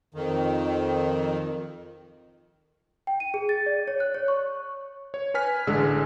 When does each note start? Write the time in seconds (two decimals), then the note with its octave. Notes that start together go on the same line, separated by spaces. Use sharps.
0.14 F2 D#3
3.07 G5
3.20 D#7
3.34 G#4
3.49 A6
3.66 D5
3.88 C#5
4.00 F#6
4.14 C#5
4.28 C#6
5.14 C#5
5.34 B4 G#5 F6 B6
5.67 A1 D3 G#3 G#4 E6